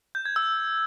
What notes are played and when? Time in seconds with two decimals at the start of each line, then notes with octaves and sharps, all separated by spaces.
0.15 G6
0.26 G#6
0.36 E6